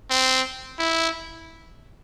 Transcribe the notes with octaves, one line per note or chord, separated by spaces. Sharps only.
C4
E4